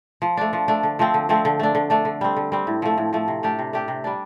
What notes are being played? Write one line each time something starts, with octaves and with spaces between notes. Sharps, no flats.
F3
A3 D4
F3
A3 D4
D3
F3 A3 C4
D3
F3 A3 C4
D3
A3 D4
D3
A3 D4
D3
G3 C4
D3
G3 C4
A2
F3 A3
A2
F3 A3
C3
A3 D4 G4
C3
A3 D4 G4
C3
G3 D4